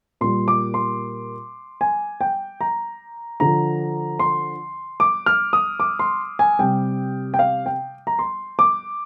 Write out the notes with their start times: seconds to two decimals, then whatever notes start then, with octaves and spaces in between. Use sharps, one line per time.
0.21 A#2 G3 C6
0.48 D6
0.74 C6
1.81 G#5
2.21 G5
2.61 A#5
3.40 D3 F3 A#5
4.19 C6
5.00 D6
5.26 F6
5.53 D#6
5.80 D6
5.99 C6
6.39 G#5
6.59 C3 G3 G5
7.34 G5
7.39 F5
7.66 G5
8.07 A#5
8.19 C6
8.59 D6